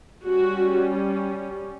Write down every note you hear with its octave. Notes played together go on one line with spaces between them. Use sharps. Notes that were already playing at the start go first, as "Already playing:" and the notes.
G3 C#4 F#4